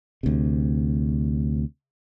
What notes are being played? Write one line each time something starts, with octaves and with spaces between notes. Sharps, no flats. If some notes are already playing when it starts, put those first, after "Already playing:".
D2 C3